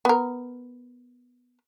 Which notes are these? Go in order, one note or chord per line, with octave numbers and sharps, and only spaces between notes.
B3 A#4